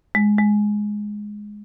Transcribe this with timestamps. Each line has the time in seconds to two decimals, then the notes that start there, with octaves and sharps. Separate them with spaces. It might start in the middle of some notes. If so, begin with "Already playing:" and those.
0.15 G#3
0.38 G#3